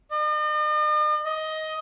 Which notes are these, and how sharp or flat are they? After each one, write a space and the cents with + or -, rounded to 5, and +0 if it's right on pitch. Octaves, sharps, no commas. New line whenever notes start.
D#5 -45
D#5 +15